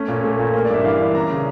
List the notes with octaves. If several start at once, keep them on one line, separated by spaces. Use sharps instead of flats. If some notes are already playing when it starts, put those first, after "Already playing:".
Already playing: A3 C#4
A#2
A3
A#2
A#3
D5
G2 E5
E3 F5
D4
C#4 A#5
C#3